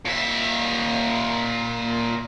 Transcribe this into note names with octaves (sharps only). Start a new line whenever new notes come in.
A#2 E5